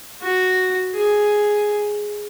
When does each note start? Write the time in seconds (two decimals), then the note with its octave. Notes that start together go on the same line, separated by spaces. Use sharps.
0.22 F#4
0.95 G#4